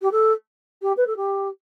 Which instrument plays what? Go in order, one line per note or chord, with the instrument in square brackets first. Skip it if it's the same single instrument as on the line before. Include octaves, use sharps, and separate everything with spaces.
[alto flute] G4
A4
G4
B4
A4
G4